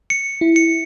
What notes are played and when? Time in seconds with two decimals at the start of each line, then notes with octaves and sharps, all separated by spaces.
0.10 C#7
0.41 E4
0.56 C#7